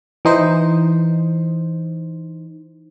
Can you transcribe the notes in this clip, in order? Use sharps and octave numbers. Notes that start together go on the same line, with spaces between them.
E3 D#4 C5